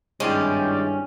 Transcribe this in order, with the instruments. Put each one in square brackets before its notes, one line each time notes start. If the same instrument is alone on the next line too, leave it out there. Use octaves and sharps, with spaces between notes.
[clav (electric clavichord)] G#1 G#3 [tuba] G2 [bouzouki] C#4 [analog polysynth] E4 D5 G5